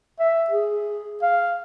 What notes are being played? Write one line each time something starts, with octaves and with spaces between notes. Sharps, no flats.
E5
G#4
F5